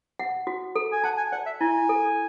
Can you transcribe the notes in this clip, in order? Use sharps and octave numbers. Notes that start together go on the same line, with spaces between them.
F#5
F#4
A4
G#5
F#5 A5
G#5
D5 F#5
E5
E4 G#5
A4